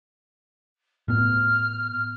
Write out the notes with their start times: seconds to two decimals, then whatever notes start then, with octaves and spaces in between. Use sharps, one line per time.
1.08 A2 B3 F6